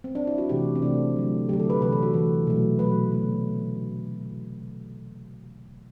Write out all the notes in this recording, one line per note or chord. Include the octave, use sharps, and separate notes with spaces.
C4
D4
E4
F#4
C3 E3 A3 G4
C4
C3 E3 A3 D4
D3 F#3 A3
D3 F#3 A3 G4
A4
B4
C3 E3 A3 B4
A4
F#4
C3 E3 A3
B2 F#3 A3
B2 F#3 A3 B4
D3 A3